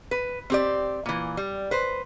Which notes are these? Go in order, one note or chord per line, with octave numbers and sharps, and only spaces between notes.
B4
C4 G4 D5
A#2 E3
G3
B4 C5